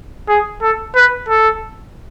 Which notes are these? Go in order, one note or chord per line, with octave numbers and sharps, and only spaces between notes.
G#4
A4
B4
A4